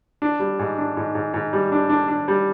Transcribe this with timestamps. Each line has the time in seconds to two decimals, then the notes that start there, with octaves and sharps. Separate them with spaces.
0.22 D4
0.39 G3
0.59 G#2
0.78 D4
0.97 G#2
1.15 G#2
1.34 G#2
1.53 G3
1.72 D4
1.90 D4
2.08 D4
2.28 G3